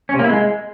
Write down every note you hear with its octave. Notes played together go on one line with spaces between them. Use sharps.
C#4
C3
A#3
E4
G#3